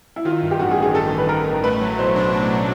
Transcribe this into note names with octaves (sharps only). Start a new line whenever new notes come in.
E4
D#3 F4
G2
G4
A1 F#4
G#4
A1
G#4
D#3 A4
G2
B4
A1 A#4
A1
A3 B4
F#3
B2 C5
D4
A3
F#3